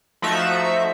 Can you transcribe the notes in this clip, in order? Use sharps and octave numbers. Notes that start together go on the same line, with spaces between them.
F3 A3 D#4 F#4 E5